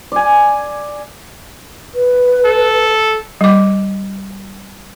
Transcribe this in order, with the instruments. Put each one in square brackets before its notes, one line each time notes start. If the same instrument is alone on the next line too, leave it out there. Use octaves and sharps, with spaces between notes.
[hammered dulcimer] D5 G#5
[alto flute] B4
[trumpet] A4
[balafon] G3 D6